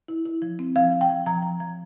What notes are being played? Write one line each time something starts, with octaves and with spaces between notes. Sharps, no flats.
E4
E4
F3
C4
F3 F5
F3
G5
F3
F3 A#5
F3
F3